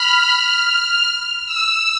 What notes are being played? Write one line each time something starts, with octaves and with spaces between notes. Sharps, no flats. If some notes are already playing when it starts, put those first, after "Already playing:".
Already playing: B5 F6
F6
F6
E6